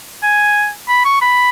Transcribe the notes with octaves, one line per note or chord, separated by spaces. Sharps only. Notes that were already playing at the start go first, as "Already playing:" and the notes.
G#5
B5
C#6
B5